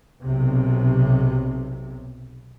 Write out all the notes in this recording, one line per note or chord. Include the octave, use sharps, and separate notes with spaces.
B1 C3